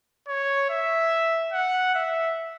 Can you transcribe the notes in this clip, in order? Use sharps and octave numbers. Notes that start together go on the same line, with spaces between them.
C#5
E5
F#5
E5